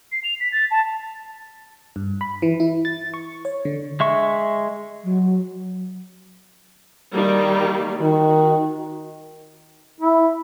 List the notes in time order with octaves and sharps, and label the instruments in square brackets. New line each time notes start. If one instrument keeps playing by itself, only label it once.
[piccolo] C7
F7
B6
A6
A5
[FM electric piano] G2
B5
E3
E4
A6
C#6
C#5
D3
[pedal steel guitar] G#3 E5 C#6
[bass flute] F#3
[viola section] D#3 G3 A#3
[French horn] D#3 [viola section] F#4
[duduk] E4